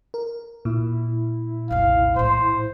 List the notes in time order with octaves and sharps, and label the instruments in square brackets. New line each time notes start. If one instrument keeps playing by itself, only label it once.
[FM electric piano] A#4
[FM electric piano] A#2 [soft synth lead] E4
[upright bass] F1 B1 [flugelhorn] F5
[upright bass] A1 A2 [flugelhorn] C5